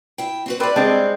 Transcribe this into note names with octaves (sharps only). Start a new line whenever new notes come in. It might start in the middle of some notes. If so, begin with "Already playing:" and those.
E4 G5
C4 F#4 B4
G3 C4 E4 B4 D5
G3 G#3 C4 D4